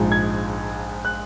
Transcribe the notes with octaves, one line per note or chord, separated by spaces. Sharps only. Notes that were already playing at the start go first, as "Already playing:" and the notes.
Already playing: A#1 G#2 F3 G#3
G#6
F#6